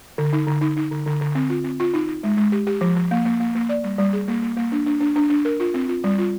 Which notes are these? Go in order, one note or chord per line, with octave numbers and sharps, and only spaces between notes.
D3
D#4
D3
D#4
D#4
D3
D3
D3
C4
F4
C4
F4
D#4
D#4
G#3
G#3
G4
G4
F3
F3
A#3
A#3
A#3
A#3
D5
G3
G3
G#4
A#3
A#3
A#3
D4
D4
D4
D4
D4
A#4
F4
C4
F4
G3
F4